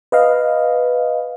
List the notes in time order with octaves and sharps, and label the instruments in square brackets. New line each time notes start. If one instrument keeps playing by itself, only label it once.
[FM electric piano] B4 D#5 F5